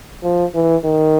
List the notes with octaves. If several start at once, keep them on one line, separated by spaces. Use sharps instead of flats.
F3
E3
D#3